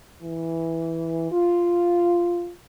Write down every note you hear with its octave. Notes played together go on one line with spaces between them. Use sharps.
E3
F4